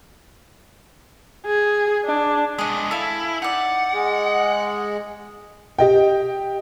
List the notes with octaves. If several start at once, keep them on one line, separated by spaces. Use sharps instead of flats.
G#4
D4
G#3 D4 G#4 D#5
E4 A4 F5 G#5
D#4 D5 F#5
G#3
G4 D#5 G5